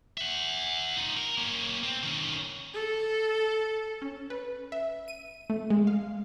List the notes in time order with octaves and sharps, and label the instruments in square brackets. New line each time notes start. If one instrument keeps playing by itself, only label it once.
[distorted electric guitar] E5 F#5
D#4 F4
A#4
A#3 C#4
C4
D#3 C#4
[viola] A4
[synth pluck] C#4
B4
E5
D#7
A3
G#3
F5